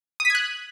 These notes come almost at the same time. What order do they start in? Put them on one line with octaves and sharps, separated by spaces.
D#6 B6 G#6 F#6